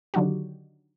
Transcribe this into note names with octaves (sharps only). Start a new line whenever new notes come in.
D3 D#3 F#3 D#4 F#4 G4